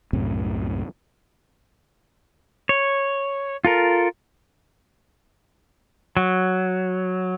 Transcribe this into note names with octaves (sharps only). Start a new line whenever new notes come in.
C2 F#2 A2 C3
C#5
F4 A4 A#4
F#3